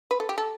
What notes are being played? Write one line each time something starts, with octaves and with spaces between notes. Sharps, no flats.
B4
A4
G4
A4